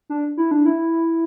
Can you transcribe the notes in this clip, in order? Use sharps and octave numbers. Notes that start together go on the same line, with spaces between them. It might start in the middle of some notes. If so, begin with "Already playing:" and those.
D4
E4
D4
E4